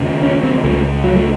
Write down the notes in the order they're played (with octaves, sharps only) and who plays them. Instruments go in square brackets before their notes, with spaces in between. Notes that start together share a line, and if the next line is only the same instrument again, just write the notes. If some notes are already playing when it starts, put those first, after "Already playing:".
Already playing: [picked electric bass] D#2 C#3
C#4
C4
C#2 C#3 A3
F#3
A3